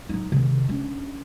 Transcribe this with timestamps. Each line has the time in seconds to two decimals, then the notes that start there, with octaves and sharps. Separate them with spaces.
0.09 F#3 D#4
0.32 C3 D#3
0.69 C#4 D4